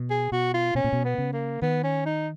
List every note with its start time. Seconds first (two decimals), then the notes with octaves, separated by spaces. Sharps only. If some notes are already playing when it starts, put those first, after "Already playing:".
Already playing: B2
0.10 G#4
0.32 B2 F#4
0.54 F4
0.75 B2 C#4
0.84 A#2
0.93 B2
1.04 B3
1.18 C#3
1.33 A#3
1.62 D#3 B3
1.83 C#4
2.05 D#4